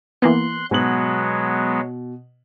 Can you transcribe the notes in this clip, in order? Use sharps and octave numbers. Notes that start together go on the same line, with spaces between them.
E3 A#3 B3 C6 F#6
G#2 B2 F#3 G#3 B3 F#7